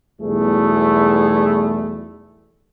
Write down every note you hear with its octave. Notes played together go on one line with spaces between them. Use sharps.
B1 E2 G3 A3 E4 G#4